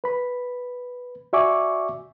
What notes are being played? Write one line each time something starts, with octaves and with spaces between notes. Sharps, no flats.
B4 B5
F#4 D5 E5 G#5 C#6 D6